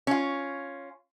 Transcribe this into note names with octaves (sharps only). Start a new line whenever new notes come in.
C#4 F4